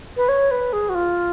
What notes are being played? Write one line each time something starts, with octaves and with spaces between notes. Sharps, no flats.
B4
C#5
B4
G#4
F#4
F4